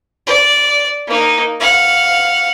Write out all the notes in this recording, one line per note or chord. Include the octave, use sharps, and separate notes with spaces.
D5
A#3 D#4
F5 F#5